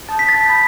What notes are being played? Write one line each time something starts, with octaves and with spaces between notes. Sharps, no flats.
A5 D#6 G6 A6
B6
A6
B5 D#6 G6